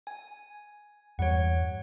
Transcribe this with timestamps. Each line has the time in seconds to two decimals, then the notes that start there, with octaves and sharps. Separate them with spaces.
0.07 G#5
1.19 E2 G2 G3 C#5 F#5